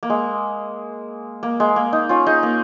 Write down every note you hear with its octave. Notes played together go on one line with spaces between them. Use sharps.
A#3
G#3
A#3
G#3
A#3
D#4
C#4 F4
D#4 G#4
A#3